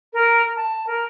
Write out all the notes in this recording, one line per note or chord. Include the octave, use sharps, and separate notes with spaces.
A#4
A5
A#4